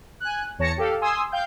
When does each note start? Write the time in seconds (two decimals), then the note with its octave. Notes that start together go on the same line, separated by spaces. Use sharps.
0.20 G#5 F#6
0.59 E2 C#5 A5 A#6 C#7
0.77 G4 A4 F5
1.01 G#5 C6 D#6 E6
1.32 F5 G5 G6